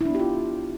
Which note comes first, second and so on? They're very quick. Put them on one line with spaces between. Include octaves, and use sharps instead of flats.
E4 D4 B3 G4 F4